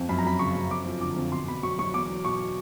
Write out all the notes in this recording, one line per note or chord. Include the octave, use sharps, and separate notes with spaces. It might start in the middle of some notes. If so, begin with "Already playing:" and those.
Already playing: F2
F#2 B5
A#5
F#3 B5
C#3 C#6
F#2
F2 D6
F3
D3 D6
F2
B2 C6
B2 B5
F#3 C#6
F#3 C#6
E2 D6
F#3
B2 C#6